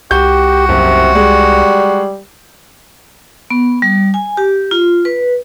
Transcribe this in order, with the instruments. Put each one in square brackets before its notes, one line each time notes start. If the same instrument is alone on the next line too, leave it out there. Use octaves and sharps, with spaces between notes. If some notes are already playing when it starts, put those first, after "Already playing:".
[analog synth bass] C2 [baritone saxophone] F#4 [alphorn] G4 [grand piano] G6
[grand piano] F#1 [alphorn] C3
[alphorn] G3 [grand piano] G#3
[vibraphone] B3
G3
G#5
G4
F4
B4